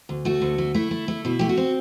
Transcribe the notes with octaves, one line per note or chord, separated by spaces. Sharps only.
D2
A3 F#4
D2
A3
A3 E4
A3
A3
B2 E4
A3 G4
F#4
C4